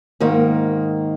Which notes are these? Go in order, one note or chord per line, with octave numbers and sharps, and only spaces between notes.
G#2 D#3 A#3